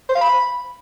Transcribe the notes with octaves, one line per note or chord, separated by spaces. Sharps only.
C5
F5
B5